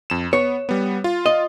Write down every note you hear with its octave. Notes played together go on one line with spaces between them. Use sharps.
F2 E7
B3 C#5
G3 B3
F4
D#5